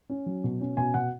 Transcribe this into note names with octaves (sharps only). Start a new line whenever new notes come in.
C#4
F#3
B2
C#4
B2 G#5
B2 F#5